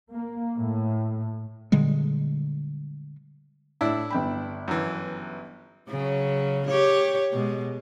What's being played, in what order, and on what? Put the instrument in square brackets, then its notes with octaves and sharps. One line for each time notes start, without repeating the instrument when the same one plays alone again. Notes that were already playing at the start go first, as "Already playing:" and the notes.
[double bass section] A#3
A2
[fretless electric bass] A#2 D3 G3 G#3
[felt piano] A2 [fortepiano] D4 E4
[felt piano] G1 G5 B5
[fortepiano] F#2 E3
[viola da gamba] C#3 F#3
G4 C#5
B2 G#3